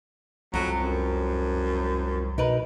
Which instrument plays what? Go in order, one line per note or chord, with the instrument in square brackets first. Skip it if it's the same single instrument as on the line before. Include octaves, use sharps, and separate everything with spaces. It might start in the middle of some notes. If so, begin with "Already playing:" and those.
[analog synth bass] C2 [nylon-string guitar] F2 F3 [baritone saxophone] F#3
[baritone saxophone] F#2
[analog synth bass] B2 [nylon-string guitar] D#4 A#4 B4